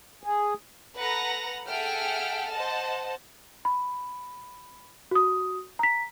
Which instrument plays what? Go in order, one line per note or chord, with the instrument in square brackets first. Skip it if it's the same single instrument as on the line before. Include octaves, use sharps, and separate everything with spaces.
[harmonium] G#4
[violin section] A4 B4 F#5 A#5 A#6
G#4 A4 E5 F#5 G5 F6
C5 D#5 F#5 A5
[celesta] B5
F#4 D#6
A#5 B6